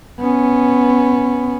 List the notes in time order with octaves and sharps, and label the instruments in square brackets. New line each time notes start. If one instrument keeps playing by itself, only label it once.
[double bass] B3 C#4